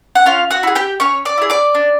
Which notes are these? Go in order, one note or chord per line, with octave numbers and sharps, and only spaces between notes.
F#5
C#4 F4 F5
F#4 F#5
E4 G#4
G4 G5
C#4 C#5 C#6
D5 D6
E4 G#4
D5 D6
D4